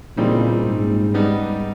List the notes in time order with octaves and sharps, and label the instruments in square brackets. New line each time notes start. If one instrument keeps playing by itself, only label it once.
[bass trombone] A#2 [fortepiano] C#3 E3 G3 C4 D#4
[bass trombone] G#2
[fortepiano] G3 B3 D#4